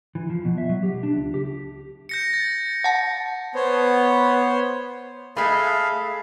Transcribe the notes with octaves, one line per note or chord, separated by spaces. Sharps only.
E3
F3
B2
E5
F#3
G4
D4
C#2
G4
G6 A#6 C#7
A6
F#5 A5
B3 C5 C#5
G#3 A3 G#4 E5 F5 B5